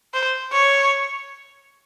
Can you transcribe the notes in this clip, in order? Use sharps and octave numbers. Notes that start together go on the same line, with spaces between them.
C5
C#5